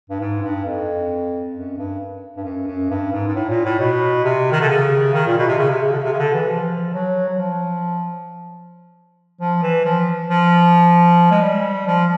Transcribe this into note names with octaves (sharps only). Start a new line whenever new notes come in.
G2
G#2
G2
F2
F#2
G2
G2
F#2
F#2
G2
G#2
G#2
A2
A#2
A2
B2
C3
D#3
D3
C#3
D#3
A#2
B2
C3
C#3
C3
C#3
D3
C#3
C3
C#3
D3
E3
F3
F#3
F#3
F3
F3
E3
F3
F3
G#3
G3
F3